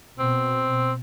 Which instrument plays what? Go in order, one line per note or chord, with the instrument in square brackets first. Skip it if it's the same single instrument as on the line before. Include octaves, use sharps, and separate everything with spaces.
[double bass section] B2 [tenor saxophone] C4